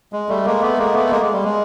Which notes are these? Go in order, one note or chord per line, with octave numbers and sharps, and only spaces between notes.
G#3
G3 A3
G#3 A#3
A3 B3
G#3 A#3
A3 B3
G#3 A#3
G#3
G3
G#3